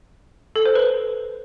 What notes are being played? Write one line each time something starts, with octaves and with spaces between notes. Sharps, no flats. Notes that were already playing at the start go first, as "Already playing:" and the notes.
A4
C5
B4